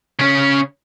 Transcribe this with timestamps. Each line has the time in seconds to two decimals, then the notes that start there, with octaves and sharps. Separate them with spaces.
0.19 C#3 C#4